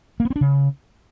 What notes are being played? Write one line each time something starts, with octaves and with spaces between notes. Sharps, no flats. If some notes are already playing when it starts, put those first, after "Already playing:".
A#3
B3
C4
D4
C#3